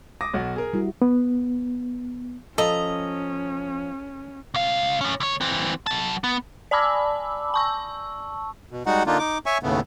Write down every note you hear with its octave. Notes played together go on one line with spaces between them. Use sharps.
D6 D#6 A#6
B1 F#4
G#4 A#4
G3 E4 F#4
B3
F3 C#4 A4 D#5 A#5
C#2 F5
A2 C#4
D2 C#5
E3 C4
F#3 A5
B3
D5 G#5 A5 B5 D6 E6
A5 C#6 E6
B2
G3 G#3 D#4 F#4 F#5
D3 A#3 D4 D#4 F4
D#4 D6
C#5 E5 G#5 C#6
D#2 A2 C#3 A3 B3